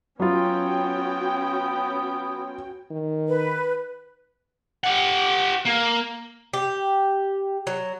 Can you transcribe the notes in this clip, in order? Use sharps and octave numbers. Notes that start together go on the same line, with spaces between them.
F#3 B3 C#4 F4 F#4 G5
D#3
B4
G4 F#5
A#3
G4
F#3